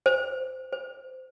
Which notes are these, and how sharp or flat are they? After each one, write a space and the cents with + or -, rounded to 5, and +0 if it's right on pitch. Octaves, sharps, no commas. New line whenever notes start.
C5 -15
C5 -25